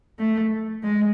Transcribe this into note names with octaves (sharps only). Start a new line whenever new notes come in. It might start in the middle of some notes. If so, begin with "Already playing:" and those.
A3
G#3